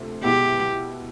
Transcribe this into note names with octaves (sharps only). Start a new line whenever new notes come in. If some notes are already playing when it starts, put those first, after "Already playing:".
Already playing: D2 C3 F3 A3
B2 G#3 B3 E4 G4